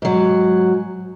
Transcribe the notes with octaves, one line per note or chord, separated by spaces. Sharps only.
G#2 F#3